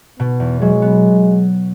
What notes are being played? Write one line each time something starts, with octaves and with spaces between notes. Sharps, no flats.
B2 B3
E2
F#3 G#3
B3